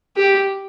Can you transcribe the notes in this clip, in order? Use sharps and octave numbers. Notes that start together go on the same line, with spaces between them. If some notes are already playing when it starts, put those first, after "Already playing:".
G4